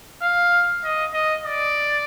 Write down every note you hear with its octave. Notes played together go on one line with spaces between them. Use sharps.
F5
D#5
D#5
D5